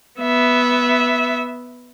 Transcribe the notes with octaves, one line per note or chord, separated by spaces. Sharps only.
B3 E5